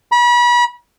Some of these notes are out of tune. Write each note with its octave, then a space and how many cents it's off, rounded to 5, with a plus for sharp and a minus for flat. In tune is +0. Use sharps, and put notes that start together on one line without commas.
B5 -35